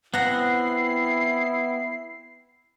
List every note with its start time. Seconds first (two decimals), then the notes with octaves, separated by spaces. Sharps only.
0.14 B3 C4 E4 F#5 A#5 C7